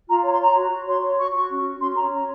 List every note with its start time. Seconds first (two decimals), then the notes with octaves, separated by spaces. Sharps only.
0.08 F4 A#5
0.23 C#5 A#5
0.32 C6
0.40 C#5 A#5
0.55 F#4
0.71 F#4
0.86 C#5 C6
1.02 C#5
1.18 F#4 C#6
1.34 F#4 C#6
1.50 C#4
1.65 F#4
1.81 C#4 C6
1.96 C#5 A#5
2.12 C#4 A#5